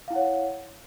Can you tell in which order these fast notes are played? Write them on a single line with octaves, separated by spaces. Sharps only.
F5 E4 F#5 C#5